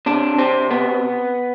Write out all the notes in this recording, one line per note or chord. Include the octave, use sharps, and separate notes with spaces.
C3 D4
C3 C4
C3 B3